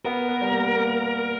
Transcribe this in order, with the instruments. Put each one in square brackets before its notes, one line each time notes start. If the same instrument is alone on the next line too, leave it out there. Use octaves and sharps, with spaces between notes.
[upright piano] B3 [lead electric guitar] A#4
[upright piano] B3
G3
A#3
A#3